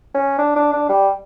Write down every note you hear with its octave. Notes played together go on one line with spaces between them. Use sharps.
C#4
D4
D4
D4
G3